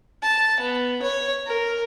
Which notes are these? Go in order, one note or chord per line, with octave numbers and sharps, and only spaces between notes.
A5
B3
C#5
A#4